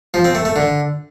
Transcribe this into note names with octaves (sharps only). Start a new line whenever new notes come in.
F3
C4
A3
A3
D3